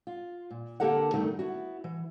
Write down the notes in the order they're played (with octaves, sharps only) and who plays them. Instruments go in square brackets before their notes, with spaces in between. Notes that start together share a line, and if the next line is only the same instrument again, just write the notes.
[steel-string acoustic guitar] F4
A#2
D3 A#3 G4 A4 A#4 F#5
E2 G2 D#3 A3 D#4
B3 E4 F#4
E3